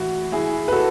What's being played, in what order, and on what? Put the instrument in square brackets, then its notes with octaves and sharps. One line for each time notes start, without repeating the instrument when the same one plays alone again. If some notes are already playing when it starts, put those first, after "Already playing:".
Already playing: [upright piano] A2 E3 E4 F#4
E4 G#4
B4
F#4 A4